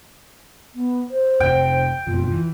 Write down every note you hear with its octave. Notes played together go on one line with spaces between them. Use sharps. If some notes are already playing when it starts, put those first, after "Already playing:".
B3
C5
F1 A2 C3 G5
F#1 F2 B2 F4
E3